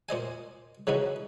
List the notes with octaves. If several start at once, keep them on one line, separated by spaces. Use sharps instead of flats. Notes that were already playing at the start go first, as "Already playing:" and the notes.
A#2 C5 D#5 G#5
C#3 E3 F3 D#4 F#4